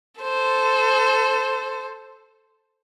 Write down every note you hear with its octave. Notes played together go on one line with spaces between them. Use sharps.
A4 C5